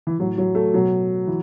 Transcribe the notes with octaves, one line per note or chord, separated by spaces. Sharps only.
E3
A2 E3 F#3
F#3
A3
B2 F#3
E3